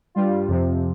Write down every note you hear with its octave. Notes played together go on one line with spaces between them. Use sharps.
G2 G3 F4
F2 C3 F3